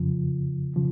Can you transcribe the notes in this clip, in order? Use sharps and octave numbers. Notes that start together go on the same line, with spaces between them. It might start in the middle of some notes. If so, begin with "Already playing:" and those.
Already playing: F2 C#3 F3
C#3 F3